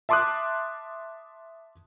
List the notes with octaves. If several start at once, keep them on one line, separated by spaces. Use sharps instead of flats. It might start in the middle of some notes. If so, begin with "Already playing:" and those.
E5 A5 C6 D6 D#6 F#6